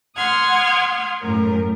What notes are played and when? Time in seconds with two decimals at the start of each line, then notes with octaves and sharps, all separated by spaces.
0.16 F#5 C6 D#6 F6 G#6
1.21 F#2 A2 A#4